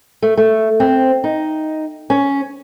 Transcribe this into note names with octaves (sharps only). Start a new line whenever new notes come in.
A3
A3
C4
D#4
C#4